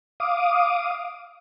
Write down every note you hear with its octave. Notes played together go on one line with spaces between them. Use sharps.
F5 D6 D#6